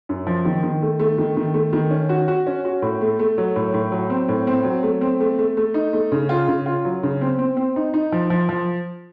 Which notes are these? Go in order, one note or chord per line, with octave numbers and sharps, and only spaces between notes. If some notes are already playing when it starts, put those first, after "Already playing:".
F#2
F3
D#3
D#3
A3
A3
D#3
D#3
A3
D#3
C#4
F#4
F#4
C#4
F#4
A2
A3
A3
F#3
A2
A2
F#3
C4
A2
C4
F#3
A3
C4
A3
A3
A3
D#4
A3
C#3
F4
C#3
F4
F#3
C#3
C4
C4
C4
D#4
D#4
F3
F3
F3